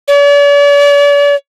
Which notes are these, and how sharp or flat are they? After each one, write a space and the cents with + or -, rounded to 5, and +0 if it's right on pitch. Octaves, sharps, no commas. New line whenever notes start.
D5 -45